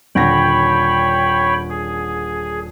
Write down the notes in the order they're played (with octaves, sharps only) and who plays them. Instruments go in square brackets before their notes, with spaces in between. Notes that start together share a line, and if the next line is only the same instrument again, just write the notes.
[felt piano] D#1 D3 A#6 [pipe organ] C#5 G5 B5
[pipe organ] G#4